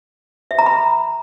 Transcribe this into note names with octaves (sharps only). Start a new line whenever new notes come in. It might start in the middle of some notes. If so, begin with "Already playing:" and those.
E5
A#5
B5